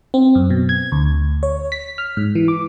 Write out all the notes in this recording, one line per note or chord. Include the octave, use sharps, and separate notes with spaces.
C4
F#2
B2
G#6
D2
C#5
B6
F6
G#2
E3
D6